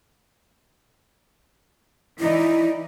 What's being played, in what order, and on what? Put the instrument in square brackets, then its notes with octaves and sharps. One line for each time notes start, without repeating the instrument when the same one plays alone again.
[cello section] E3 D#4 D5 [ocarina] E4